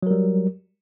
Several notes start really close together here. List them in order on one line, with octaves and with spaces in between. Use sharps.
F#3 A#4 G3